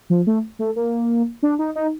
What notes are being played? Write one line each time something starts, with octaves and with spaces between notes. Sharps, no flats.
F3
A3
A3
A#3
D4
D#4
D#4